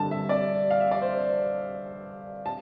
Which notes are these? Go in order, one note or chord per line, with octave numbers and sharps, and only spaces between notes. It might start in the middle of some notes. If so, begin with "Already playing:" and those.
Already playing: G2 D3 A5
E5
D5
F5
E5
D5
C5
A5